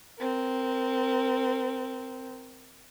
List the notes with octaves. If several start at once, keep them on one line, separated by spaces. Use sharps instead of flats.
C4 A#4